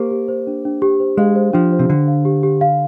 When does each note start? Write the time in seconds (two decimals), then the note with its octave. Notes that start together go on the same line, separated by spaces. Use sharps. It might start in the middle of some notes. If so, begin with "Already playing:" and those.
Already playing: A#3 G4 C5
0.11 G4
0.28 C5
0.47 D4
0.65 D4
0.82 G4
1.00 C5
1.17 G#3 F5
1.36 C5
1.53 F3 D4
1.72 C5
1.79 C3
1.90 D3 D4
2.08 F5
2.25 G4
2.43 G4
2.61 F5